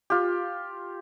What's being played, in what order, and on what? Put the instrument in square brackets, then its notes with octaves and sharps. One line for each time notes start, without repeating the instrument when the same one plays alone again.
[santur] F4 G4